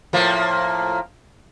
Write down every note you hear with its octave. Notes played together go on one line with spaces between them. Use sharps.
A2 F3 A#3